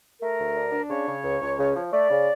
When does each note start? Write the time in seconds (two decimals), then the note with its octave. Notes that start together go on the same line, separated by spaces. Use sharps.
0.21 A3 A#4
0.39 D2
0.56 D4
0.72 D4
0.90 C#3 C#5
1.08 C#3
1.24 C#2
1.41 C#2
1.59 C#3
1.76 F3
1.93 A3 D5
2.10 C#3